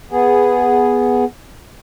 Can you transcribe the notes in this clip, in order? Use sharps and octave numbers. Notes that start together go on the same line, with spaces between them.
B3 G#4